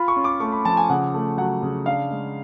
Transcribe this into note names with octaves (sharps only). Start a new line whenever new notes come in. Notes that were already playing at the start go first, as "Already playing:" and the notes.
Already playing: F4 B5
C#6
C#4
D6
A3 C#6
B5
F3 A5
G#5
C#3 F#5
A3
F#3 F#5
C#3
D4 F5
G#3